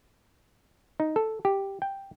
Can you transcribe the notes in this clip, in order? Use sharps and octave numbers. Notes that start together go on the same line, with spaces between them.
D#4
A4
G4
G5